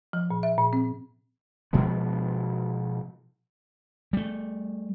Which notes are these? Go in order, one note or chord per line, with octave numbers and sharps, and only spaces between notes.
F3
A#2
E5
A#2
C4
B2 F3 G#3 B3
G3 A3